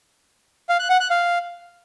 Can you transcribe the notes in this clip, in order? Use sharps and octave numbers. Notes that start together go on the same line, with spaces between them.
F5
F#6
F#5
F#6
F5